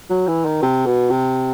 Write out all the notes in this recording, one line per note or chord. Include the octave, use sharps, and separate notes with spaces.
F#3
E3
D#3
C3
B2
C3